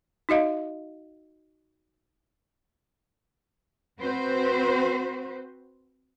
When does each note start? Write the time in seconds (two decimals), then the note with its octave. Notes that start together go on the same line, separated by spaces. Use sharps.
0.29 D#4 F#4 D#5 F5
3.99 C4 F#4 B4 C5